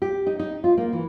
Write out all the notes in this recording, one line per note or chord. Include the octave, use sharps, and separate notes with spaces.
G4
D#4
D#4
F4
A#3
E3